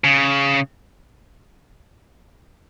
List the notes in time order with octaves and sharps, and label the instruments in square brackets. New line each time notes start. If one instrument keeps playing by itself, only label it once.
[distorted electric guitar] C#3